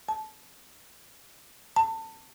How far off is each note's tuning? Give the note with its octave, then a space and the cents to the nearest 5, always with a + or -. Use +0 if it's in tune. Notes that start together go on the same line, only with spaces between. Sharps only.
A5 -25
A5 +25